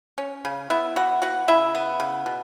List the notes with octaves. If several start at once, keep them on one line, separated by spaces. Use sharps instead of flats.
C#4
C#3
B3 E4 E5
E3 F#4 F#5
E3 F#4 F#5
C#3 E4 E5
B3
C#3
B2